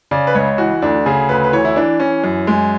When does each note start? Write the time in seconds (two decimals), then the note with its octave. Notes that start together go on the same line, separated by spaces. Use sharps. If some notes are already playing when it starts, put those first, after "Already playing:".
0.11 C#3 D5
0.27 B4
0.35 C#2 C#5
0.58 E3 F#4
0.82 D2 D4
1.06 C#3 G#4
1.29 D2 B4
1.44 B4
1.53 E3 C#5
1.65 E4
1.76 E3 D4
2.00 E3 C#4
2.24 F#2
2.47 F#2 G#3